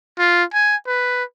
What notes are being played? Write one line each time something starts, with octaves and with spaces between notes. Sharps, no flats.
F4
G#5
B4